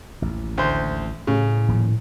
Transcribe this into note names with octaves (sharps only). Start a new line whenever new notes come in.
A1 D#2
D2 C5
A2 C#3
D#1 F3 A#3